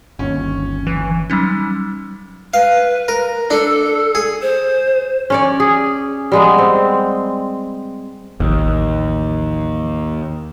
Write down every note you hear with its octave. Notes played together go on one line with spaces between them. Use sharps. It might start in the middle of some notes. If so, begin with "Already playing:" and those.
G1 D#2 C#4 C#5
E3
F#3 G3 C#4 D#4
B4 F5
A#4
D4 A4
G#4
C5
C#4 C#5 D5
G#4
G3 G#3 B3
C4
A1 D#2 F3